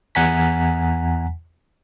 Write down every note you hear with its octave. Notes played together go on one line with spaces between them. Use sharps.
E2 F#5 G#5 A#5 B6